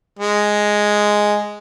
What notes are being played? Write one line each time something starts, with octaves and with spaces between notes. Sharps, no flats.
G#3